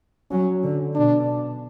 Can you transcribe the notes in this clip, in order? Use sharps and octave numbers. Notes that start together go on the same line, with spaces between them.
F#3 C#4
D3
B2 D4